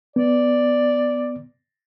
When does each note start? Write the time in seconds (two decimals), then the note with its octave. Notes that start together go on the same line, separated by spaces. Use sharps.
0.16 B3 D5